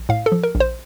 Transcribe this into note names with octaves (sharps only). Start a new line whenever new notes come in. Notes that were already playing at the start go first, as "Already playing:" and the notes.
Already playing: A#1
A2 F5
A4
F3
A#4
A#1
C5